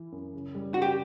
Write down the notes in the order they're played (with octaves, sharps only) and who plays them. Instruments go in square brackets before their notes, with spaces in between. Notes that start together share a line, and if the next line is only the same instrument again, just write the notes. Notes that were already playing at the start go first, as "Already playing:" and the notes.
Already playing: [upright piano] E3 E4
F#2
C#3
G3
[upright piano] C#3 [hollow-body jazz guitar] F#4
[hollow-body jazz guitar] G4